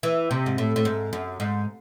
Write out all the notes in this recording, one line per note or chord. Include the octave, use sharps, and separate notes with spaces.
E3
C3
G#2
A2
A2
G#2
F#2
G#2